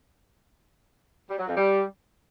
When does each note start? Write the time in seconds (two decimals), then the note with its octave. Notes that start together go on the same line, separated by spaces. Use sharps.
1.30 G3
1.39 F#3
1.48 F2
1.57 G3